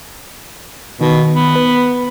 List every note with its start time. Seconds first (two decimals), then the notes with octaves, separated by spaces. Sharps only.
1.01 B2 D#3
1.34 B3
1.56 B4